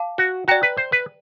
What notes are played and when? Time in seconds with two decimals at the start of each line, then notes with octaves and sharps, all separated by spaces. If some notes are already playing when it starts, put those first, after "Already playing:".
Already playing: F5 A5 D6
0.18 F#4
0.48 F#4 D5 G5 A#5
0.63 B4
0.77 C5
0.92 B4